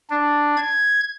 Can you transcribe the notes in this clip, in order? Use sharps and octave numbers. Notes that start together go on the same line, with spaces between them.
D4
G#6